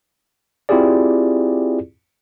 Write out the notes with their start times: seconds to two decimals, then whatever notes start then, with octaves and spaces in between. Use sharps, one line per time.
0.69 C4 E4 F4 G4 G#4 D5